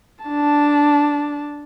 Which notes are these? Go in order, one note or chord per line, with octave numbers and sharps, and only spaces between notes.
D4 A5